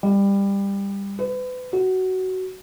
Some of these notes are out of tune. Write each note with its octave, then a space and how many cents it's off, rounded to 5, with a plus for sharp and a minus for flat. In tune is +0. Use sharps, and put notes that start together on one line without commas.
G3 +20
B4 +35
F#4 +15